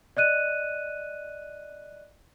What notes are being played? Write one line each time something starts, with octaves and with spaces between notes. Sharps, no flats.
D5 D#5 F#6 D#7